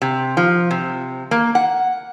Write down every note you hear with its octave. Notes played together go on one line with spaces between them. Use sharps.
C3
F3
C3
A#3
F#5